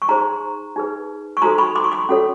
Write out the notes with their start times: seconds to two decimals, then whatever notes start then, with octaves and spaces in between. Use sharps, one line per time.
0.02 C#6
0.09 D#4 G#4 C5 A#5 C6
0.76 D#4 G#4 B4
1.37 C#6
1.42 D#4 F#4 A4 C5 A#5 C6
1.58 B5 C#6
1.75 C6 D6
1.84 C#6
1.92 C6 D6
2.09 C#4 F#4 A4 C#5